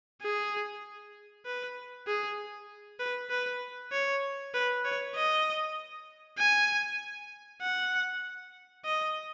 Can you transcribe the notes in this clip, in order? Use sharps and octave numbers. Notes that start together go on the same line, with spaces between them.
G#4
B4
G#4
B4
B4
C#5
B4
C#5
D#5
G#5
F#5
D#5